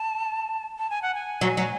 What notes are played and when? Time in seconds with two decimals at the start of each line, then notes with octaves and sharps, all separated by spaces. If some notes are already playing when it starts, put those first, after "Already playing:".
Already playing: A5
0.78 A5
0.90 G#5
1.02 F#5
1.15 G#5
1.41 F#3
1.57 F#3